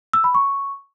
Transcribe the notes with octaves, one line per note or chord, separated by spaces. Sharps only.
E6
B5
C#6